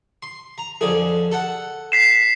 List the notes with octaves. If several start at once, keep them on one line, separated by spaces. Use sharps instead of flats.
C6
A#5
F2 D3 G#4
A4 F#5
B6 C7 E7